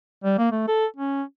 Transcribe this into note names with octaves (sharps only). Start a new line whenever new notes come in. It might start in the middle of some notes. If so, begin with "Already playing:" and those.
G3
A#3
A3
A4
C#4